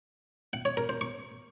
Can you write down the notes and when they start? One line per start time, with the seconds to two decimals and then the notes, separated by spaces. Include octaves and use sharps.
0.53 F#5
0.65 C#5
0.77 A#4
0.89 C5
1.01 C#6